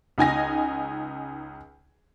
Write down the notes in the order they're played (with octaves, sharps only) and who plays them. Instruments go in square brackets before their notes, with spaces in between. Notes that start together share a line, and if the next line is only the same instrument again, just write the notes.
[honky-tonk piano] C#2 D#4 G#5 A#6